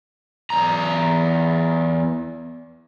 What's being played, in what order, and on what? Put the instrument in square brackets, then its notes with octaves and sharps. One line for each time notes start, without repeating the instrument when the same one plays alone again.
[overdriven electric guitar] E2 A#5